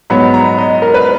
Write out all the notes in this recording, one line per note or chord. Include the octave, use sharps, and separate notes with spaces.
G#2 F#3 B3 B5
A#5
D#5
A#4
B4